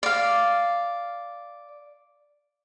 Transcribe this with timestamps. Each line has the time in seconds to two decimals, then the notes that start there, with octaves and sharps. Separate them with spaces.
0.03 D5 F5